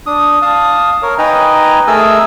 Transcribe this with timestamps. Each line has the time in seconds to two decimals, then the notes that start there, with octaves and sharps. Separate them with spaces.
0.06 D4 D#6
0.42 F5 A5 D#6
1.02 A#4 C#5
1.18 D#4 B4 D#5 G5 G#5 A#5
1.87 A3 G#4 A#4 G#5 A5 E6